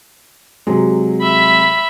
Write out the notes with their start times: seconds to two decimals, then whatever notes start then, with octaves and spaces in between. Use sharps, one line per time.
0.67 C3 F#3 G#3
1.21 E5 B5